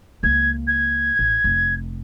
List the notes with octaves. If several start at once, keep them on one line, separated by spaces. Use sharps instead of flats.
C#2 A#3 G#6
G#6
A1
F1